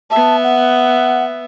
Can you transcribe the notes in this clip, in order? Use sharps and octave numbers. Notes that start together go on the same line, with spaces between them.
B3 E5 A5
F#5